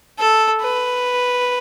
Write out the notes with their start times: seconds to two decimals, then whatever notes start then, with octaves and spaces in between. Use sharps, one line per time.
0.19 A4
0.61 B4